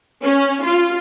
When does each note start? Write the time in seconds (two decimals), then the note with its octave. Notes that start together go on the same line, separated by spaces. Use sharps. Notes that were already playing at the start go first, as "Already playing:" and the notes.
0.22 C#4
0.64 F4